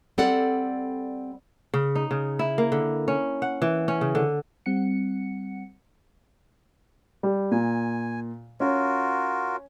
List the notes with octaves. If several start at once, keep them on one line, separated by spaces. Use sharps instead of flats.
G3 C4 A4 D5 F#5
C#3
D#4
C#3
E4
A#3
D3
C#4
F#5
E3
C#4
C#3
D3
G3 C4 F#5 C#7
G3
A#2 G#5
C#4 F4 F#4 A#4